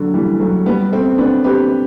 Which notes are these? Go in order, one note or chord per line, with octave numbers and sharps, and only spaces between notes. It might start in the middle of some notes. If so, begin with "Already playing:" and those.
Already playing: D3 F#3
E3 G3
F#3 A3
G3 B3
A3 C4
B3 D4
G4 B4